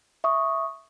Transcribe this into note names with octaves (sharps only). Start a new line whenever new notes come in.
E5 C#6 D#6